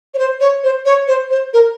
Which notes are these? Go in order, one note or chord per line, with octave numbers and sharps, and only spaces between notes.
C#5
C5
C#5
C5
C#5
C5
C5
A#4